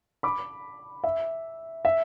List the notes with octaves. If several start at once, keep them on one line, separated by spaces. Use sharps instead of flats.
B5 D6
E5
E5